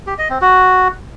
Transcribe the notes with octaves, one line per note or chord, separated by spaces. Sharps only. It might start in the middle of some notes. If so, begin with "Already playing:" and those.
G4
D#5
C4
F#4